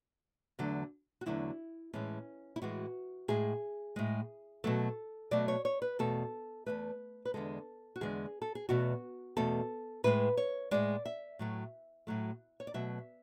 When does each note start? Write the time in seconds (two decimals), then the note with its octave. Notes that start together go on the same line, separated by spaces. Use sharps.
0.59 E2 D3 F#3 A3
1.21 F#4
1.26 E2 D3 F#3 A3 E4
1.93 A2 E3 G#3 C#4
2.56 E4
2.62 A2 E3 G#3 F#4
3.28 A2 G#3 G#4
3.96 A2 G#3
4.64 B2 F#3 A3 A4
5.31 B2 F#3 A3 D5
5.48 C#5
5.65 C#5
5.82 B4
5.99 E2 B2 A3 A4
6.66 E2 B2 A3 B4
7.25 B4
7.34 E2 D3 G#3 A4
7.96 F#4
8.01 E2 D3 G#3 G#4
8.42 A4
8.55 G#4
8.69 E2 B2 A3 F#4
9.37 E2 B2 A3 A4
10.04 A2 G#3 B4
10.37 C#5
10.71 A2 G#3 D5
11.05 E5
11.39 A2 F#3 A3
12.07 A2 F#3 A3
12.60 C#5
12.67 D5
12.74 B2 F#3 A3 E5